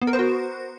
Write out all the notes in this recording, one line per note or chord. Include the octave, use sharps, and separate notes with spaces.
B3
A#4
C5
F#4